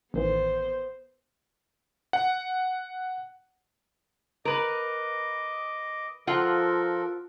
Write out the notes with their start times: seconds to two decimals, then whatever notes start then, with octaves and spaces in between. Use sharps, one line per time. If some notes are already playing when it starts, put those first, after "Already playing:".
0.14 A1 D#3 E3 B3 C5
2.13 F#5
4.45 A#4 B4 D#5 D6
6.27 F3 F4 A4 A#4 F#5